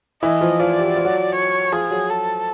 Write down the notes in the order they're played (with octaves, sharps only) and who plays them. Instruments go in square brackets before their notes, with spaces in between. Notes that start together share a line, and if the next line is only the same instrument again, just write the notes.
[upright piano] E3 E4 [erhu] D#5
[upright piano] F3 F4
[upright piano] F3 F4 [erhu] D5
[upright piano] G4
F#4
F4
F#3 F#4
[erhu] C#5
[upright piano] F3 F4 [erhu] G#4
[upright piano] F#3 F#4
[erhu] A4